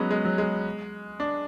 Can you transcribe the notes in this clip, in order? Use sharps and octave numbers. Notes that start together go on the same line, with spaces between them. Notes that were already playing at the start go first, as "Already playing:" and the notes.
Already playing: F#3 G#3 B3 C#4
G#3
F#3
G#3
D4